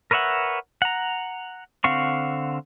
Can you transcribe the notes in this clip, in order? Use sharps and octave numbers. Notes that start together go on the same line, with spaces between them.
A#4 B4 C#5 E5 F#5
F#5 A#5
D3 C4 F5 F#5 C#6